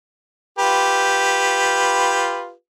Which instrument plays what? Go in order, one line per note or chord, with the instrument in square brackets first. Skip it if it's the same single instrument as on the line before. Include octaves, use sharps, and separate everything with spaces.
[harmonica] F4 G4 B4